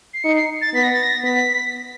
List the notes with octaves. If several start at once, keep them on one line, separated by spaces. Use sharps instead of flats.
C7
D#4 C#7
C7
A6
B3 B6
A#6
A6
A#6
B3 B6